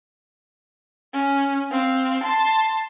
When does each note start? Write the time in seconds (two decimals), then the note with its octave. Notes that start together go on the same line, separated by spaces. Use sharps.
1.14 C#4
1.71 C4 F5
2.23 A5 C6